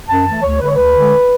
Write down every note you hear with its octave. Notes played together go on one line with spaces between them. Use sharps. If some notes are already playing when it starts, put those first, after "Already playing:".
F#2 A5
E3 A3
D2 C#5
D3 G#3 B4
C#5
D2 B4
D3 G#3